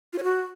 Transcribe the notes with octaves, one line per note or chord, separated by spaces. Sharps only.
F4
C#5
F#4